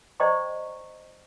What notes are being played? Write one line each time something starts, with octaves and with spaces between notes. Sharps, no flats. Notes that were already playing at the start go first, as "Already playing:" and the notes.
C5 D5 D#5 G5 A#5 C#6